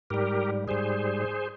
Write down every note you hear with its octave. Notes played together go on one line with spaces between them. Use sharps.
G#2 G3 G4 A#4
G#2 G3 G#4 C5